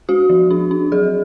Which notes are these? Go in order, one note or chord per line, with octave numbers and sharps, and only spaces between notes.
G#3 F#4
F3
D4
D4
F#3 G#4